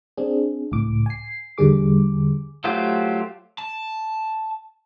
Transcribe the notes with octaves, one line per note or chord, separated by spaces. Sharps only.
C4 D4 G#4
C#2 A2 D6
G#5 C7
E2 D3 G3 G#4 D6
F#3 A3 F4 G4 C5
A5